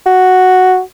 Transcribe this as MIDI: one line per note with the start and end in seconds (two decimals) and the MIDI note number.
0.06 0.80 66